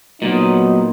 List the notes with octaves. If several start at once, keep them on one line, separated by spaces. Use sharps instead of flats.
A#2 D#3 F#3 B3 D#4